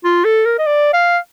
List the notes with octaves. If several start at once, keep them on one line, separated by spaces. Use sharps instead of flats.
F4
A4
A#4
D#5
D5
F5